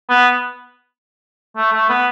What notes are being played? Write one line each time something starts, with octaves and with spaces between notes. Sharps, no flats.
B3
A3
A3
B3